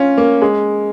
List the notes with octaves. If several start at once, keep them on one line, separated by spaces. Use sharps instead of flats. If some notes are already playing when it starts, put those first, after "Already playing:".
Already playing: C#4 F4
A#3
G#3